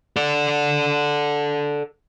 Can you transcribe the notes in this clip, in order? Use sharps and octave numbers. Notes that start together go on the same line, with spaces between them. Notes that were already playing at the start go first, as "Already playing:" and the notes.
A4 D5